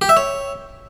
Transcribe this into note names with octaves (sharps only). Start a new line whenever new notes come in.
G4
E5
C#5